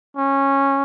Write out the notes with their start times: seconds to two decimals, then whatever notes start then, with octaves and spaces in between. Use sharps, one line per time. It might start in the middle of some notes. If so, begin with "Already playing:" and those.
0.17 C#4